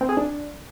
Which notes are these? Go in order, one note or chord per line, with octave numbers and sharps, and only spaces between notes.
C4
G#4
D4